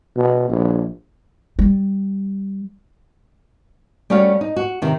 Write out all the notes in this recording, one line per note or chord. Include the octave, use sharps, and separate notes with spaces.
B2
A#1
G3
G3 A3 C#4 F#4 C#5 F5
D#4
F#4
C3 D#3